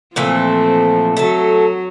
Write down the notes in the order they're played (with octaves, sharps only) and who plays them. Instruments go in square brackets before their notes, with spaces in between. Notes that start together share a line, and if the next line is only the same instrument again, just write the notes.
[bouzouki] A#2 E3 A3 [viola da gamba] F3 C4
[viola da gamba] F#3 [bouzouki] A3 A5